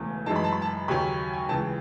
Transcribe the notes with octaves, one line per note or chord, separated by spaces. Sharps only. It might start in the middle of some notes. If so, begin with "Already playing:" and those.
Already playing: E1 E2 C#3 E3 A3
F#2 E3 G#3 D#4 A5
B5
A5
B5
A5
D#2 C#3 F#3 C#4 B5
G#5
C#2 C#3 E3 A5